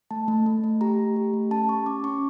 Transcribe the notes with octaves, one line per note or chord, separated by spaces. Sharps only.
A3 A5
A3
A3
A3
G4 A#5
A3
G4
A3
C#4 A5
G4 C#6
C#4 D6
C#4 C#6